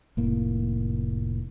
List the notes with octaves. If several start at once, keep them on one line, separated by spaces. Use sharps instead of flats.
F1 A2 A#3